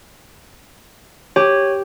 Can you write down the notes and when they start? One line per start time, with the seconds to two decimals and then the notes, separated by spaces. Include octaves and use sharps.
1.36 G4 C#5